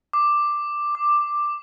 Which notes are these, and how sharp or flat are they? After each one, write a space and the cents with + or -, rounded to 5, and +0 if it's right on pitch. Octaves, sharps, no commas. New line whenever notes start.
D6 +5
D6 +10